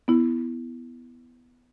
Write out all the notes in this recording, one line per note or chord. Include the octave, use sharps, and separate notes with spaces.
B3 E4